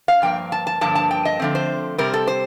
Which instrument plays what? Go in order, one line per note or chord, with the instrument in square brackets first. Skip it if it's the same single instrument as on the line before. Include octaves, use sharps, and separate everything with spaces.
[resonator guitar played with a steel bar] F5
G2 F3 A#3 G5
A5
A5
G2 D3 F3 A#3 A5
A5
G5
D#5
D3 F3 A3 C4
C5
C3 G3 C4 A#4
A4
C5